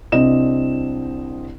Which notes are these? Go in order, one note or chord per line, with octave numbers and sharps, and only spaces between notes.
C2 C4 D4 E4 D#5 E7